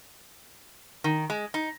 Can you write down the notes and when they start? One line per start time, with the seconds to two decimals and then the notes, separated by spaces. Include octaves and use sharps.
1.04 D#3
1.30 G#3
1.54 D#4